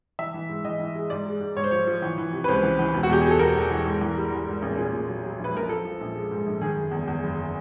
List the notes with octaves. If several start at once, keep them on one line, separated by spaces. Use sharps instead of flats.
E3 E5
E3
G#2
E3 D#5
E3
G#3
G#2 D5
G#3
G#2
G#2 C#5
C5
F3 C#5
F3
E3
E3
C3
B4
C#2 C5
E3
E3
E1
F#4
E2 G4
E1 G#4
A4
E2 A#4
E2
E3
G#2
E3
G3
E3
G#2
A1
A#2 G#4
A#2
F#3
F#3
A#1
B4
A#1 A#4
F3 A4
F3
A#1
G#3
G#2
A#1
D#3 G#4
F#1
E2
E2
F#1